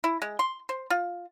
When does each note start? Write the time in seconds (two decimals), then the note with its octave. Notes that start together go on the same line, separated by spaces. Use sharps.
0.04 E4
0.22 G#3
0.39 C6
0.69 C5
0.90 F4